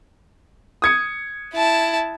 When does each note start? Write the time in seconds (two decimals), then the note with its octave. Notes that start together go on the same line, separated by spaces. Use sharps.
0.82 D#6 G#6 C#7
1.53 E4 A5